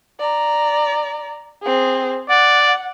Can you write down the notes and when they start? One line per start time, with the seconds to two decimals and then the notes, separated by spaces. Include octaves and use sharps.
0.20 D5 A#5
1.63 C4 G#4
2.30 D5 F#5